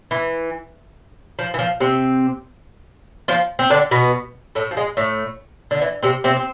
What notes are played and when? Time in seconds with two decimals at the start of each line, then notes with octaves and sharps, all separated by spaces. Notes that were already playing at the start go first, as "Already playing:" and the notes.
0.11 E3
1.39 F3
1.54 E3
1.59 F3
1.80 C3 C4
3.28 F3 F4
3.59 C4
3.70 D3 D4
3.91 B2 B3
4.55 A2 A3
4.71 F3
4.77 G#3
4.97 A2 A3
5.71 D3
5.82 E3
6.03 C3 C4
6.24 C3 C4
6.36 C4